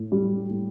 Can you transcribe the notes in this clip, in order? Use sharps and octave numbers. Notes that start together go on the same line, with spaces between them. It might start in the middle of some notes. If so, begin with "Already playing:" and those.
Already playing: A2
G3
A2